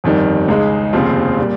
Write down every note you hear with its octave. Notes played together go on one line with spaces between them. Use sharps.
G1 F2 D#3 G3
C#2 C#3 G#3 D#4
F1 D#2 C#3 F3 C4
A#2 G3